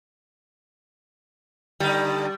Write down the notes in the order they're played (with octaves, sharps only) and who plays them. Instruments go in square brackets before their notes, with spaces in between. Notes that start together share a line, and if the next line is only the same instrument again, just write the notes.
[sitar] G2 D3 D#4 [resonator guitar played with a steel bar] G3